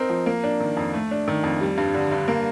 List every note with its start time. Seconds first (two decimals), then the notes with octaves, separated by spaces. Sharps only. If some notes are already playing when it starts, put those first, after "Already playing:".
Already playing: C4 D#4 A#4
0.09 F3
0.26 A#3
0.44 D4
0.60 D#3
0.77 F2
0.94 A3
1.11 D4
1.28 D#3
1.44 F2
1.61 G3
1.78 G2
1.94 D3
2.12 G2
2.28 A#3